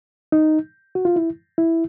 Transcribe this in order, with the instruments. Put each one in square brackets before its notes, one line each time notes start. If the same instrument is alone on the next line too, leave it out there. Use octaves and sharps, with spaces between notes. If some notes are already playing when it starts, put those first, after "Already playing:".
[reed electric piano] D#4
F#4
F4
E4
E4